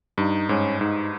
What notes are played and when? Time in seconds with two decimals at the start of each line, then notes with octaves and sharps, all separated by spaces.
0.18 G2 D#4
0.49 G#2 C#4
0.81 G#2 D#4